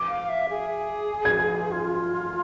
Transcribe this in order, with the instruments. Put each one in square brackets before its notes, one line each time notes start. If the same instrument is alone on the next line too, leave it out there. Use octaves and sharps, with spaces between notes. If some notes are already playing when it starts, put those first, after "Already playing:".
Already playing: [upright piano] D6
[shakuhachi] F5
E5
G#4
[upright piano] G#6
[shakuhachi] F4